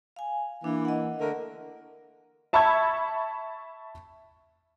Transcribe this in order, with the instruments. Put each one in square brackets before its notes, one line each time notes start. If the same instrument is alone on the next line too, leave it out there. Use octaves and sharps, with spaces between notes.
[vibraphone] F5 G#5
[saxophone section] E3 A#3 [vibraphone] D4
[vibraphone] D#5 F#5
[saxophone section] D3 A3 A#4
[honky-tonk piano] E5 A5 B5 C#6 E6 G#6